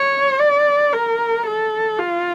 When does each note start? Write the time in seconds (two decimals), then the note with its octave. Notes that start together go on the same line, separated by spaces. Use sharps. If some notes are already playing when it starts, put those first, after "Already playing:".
Already playing: C#5
0.39 D5
0.93 A#4
1.47 A4
1.99 F4